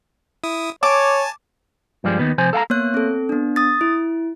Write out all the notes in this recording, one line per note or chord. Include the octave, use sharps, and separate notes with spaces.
E4 D#6
C#5 G#5 A5 D6
G2 F3 G3 G#3
D#2 D#3 B3
C3 F3 C5 G#5
A4 F5 F#5 A#5
A#3 B3 C#5 F#6
C4 A4
B3 D4
D#6 A6
E4